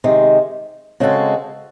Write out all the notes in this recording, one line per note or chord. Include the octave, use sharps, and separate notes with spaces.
C3 D#3 G#3
C#3 G#3 C4 F#4 A4